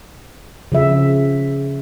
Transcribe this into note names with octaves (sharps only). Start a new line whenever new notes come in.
C#3 F3 E5